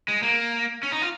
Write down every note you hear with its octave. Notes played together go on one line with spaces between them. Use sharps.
G#3
A#3
C#4
D#4
F4